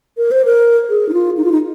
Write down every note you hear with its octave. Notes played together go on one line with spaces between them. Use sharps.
A#4
C5
A#4
G#4
D#4
F4
D#4
F4
D#4